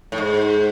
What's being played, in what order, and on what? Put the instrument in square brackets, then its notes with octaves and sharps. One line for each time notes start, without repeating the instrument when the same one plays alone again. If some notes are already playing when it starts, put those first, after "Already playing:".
[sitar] A2
G#2